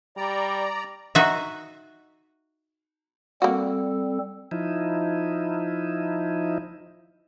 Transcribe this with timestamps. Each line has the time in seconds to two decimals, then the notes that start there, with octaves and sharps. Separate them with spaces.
0.17 G3 D5 A#5
1.15 D#4 F#4 E5
3.42 G3 A#3 C4 F#4 A4
4.51 F3 D#4 E4